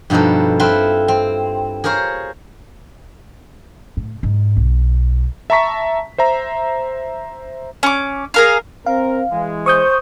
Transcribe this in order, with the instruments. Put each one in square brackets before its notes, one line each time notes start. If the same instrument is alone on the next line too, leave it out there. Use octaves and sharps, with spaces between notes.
[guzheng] G2 B2 F3 D#4 A4
C4 E4 F4 A4 B4
C4
G#4 A#4 C5 C#5 F5
[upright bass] A2
G#2
B1
[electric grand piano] E5 A5 A#5 C#6 B6
C5 E5 A#5
[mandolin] C#4 D6
G#4 A#4 F5
[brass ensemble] C4 A#4 [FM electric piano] F5
[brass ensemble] E3 G#3
[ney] C5 [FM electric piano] C#6 D#6 G6